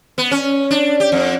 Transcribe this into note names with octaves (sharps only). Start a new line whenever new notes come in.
B3
C#4
D4
G4
F2